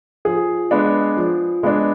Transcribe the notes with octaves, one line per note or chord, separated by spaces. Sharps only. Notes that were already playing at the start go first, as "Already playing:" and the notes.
F3 G#4
G#3 B3 D4
F3
G#3 B3 D4